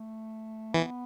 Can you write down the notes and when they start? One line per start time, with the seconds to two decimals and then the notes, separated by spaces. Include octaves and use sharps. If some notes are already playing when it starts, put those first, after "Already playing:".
Already playing: A3
0.74 E3 B3